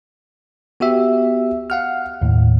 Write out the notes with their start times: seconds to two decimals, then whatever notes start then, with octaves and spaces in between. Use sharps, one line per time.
0.80 B3 F#4 G4 E5
1.70 F5 F#5 F6
2.22 D#2 A2